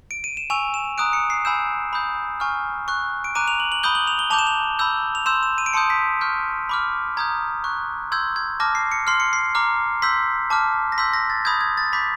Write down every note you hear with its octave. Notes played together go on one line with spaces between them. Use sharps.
D7
D#7
E7
G#5 C#6 E6 F7
E7
A#5 D#6 F#6 D7
C#7
C7
G#5 B5 E6 G6 E7
B5 D#6 G6
G#5 C#6 F6
C#6 F#6
D7
A#5 D6 F#6 D#7
F7
F#7
F#7
B5 D#6 G6 G7
F#7
F7
G7
A5 D6 G6 F7
E7
F7
B5 E6 G6
F7
C6 E6 G6 E7
E7
D#7
D7
A5 C6 D#6 G6 C#7
B6
C#6 F6 G6
B5 D6 F6
A#5 D#6 G6 G#6
C#6 F#6
C6 E6 G6 G#6
G#6
A5 D6 F6 A#6
C7
C#7
C6 F6 C7
C#7
C7
A#5 D6 F6
C6 E6 G6 B6
A5 D6 F6
A#6
C6 E6 G6 B6
A#6
A6
B5 D#6 G6 G#6
G#6
A6
B5 D6 G6 B6